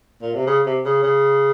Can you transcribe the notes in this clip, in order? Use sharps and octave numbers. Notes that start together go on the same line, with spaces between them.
A#2
C3
C#3
C3
C#3
C#3